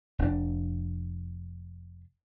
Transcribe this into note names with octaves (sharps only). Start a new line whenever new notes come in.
F1 C4 D4